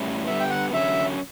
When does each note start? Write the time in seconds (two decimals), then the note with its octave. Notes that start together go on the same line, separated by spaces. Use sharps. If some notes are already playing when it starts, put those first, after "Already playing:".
Already playing: A2 G3 C#4 E4
0.27 D3 G3 B3 E5
0.40 G5
0.50 F#5
0.73 D3 F#3 C#4 E5